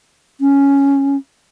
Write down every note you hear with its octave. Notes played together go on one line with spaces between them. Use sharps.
C#4